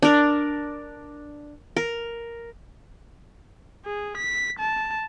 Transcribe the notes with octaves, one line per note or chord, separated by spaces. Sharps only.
D4 A#4
A#4
G#4
B6
A5